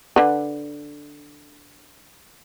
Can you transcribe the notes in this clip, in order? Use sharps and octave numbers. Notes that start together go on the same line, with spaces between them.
D3 B4